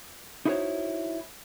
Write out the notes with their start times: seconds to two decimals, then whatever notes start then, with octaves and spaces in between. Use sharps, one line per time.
0.45 D#4 E4 F#4 G#4 C5 C#5